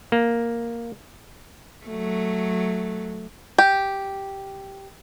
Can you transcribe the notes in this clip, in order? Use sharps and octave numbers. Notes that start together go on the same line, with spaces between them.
A#3
F#3 A3
G4